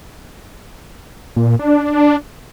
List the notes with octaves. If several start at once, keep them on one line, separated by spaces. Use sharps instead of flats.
A#2
D4